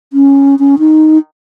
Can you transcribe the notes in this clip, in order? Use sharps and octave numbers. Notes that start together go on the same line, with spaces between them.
C#4
C#4
D#4